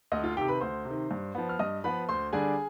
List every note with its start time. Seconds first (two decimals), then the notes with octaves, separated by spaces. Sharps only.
0.12 D2 D#5
0.24 F4 F5
0.36 D#3 G4 G5
0.41 C3
0.48 B4 B5
0.60 D2 C5 C6
0.85 C3
0.90 D#3
1.11 G2
1.35 F3 B3
1.49 F6
1.59 G2 D#5 D#6
1.84 F3 B3 B4 B5
2.09 D2 C5 C6
2.33 D3 G3 D4 G#4 G#5